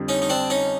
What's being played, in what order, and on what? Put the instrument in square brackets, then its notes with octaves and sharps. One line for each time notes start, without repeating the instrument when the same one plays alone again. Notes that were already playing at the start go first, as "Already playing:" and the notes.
Already playing: [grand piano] F2 D3 G3
[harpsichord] C#4 D#4
D#4
C4 D4
C#4 D#4